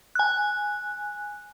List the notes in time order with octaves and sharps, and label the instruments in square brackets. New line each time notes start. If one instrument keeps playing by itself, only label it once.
[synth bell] G#5 F#6